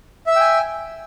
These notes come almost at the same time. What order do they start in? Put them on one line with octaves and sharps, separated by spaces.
E5 E6 G5 G#5